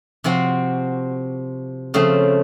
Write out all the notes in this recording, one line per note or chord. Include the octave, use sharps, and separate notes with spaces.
C3 F3 C4 F#4
C#3 F3 A3 C4